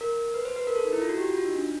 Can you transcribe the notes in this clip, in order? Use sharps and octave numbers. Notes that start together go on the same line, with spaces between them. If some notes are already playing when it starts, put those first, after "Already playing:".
A#4
B4
C5
B4
A#4
A4
D#4
E4
F4
F#4
G4
F#4
F4
D#4
D4